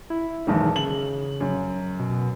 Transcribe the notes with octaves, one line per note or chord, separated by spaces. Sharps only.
E4
B1 E2 G#2 D#3
C#3 F#7
F#2
B2